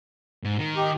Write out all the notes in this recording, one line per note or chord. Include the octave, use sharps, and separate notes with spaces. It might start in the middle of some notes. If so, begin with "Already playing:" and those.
G#2
D#3
D#4 G4